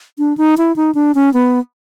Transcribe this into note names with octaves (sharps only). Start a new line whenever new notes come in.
D4
D#4
E4
D#4
D4
C#4
B3